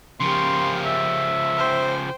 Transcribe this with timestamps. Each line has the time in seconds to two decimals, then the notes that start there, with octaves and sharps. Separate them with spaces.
0.20 C#3 F3 A#3 G4 C6
0.85 E5
1.57 C5 G5